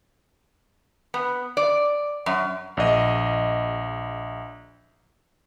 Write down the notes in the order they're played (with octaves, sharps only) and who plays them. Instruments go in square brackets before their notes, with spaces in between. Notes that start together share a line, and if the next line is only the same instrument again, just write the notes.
[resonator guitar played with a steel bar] B3
D5
F#2
[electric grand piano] A#1 D#5